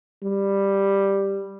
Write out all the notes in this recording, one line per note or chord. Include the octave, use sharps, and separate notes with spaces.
G3